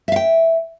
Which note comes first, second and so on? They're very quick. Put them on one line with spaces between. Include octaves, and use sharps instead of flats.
E5 F5 G5